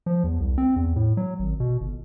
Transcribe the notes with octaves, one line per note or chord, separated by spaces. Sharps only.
F3
E2
C2
C4
E2
A2
F#3
G#1
B2
G1